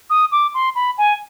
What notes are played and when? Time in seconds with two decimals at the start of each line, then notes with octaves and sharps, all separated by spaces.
0.10 D#6
0.32 D6
0.54 C6
0.75 B5
0.98 G#5